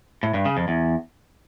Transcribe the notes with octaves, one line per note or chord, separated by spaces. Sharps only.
A2
G2
C#3
F2
E2